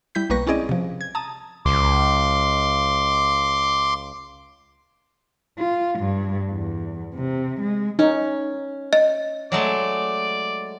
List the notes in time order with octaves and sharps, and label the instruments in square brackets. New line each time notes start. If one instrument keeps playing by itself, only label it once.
[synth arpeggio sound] G3 E4 G6 B6
B1 G3 A#3 B4 C#6 A#6
C4 C#4 E4 G#4 D5 D#5
C3 F3
G#6
A5 A#5 D#6
[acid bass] C#2 [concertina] C6 D6
[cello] F4
G2
E2
C3
G#3
[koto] C#4 [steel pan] D#4
[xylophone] D#5
[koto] F#3 G#3 A3 [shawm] D5